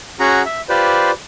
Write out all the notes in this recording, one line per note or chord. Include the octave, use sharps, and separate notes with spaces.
C#4 F#4 G#4 F#5 A#5
E5
F4 G4 B4 C5 D5